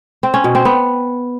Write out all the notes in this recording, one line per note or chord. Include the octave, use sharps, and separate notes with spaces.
C4
C#4
B2
C4
B3